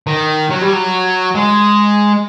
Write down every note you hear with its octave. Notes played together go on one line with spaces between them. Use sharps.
D#3
F#3
G3
F#3
G#3